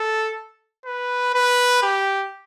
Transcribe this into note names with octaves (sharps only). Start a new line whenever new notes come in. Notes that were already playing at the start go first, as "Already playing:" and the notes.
Already playing: A4
B4
B4
G4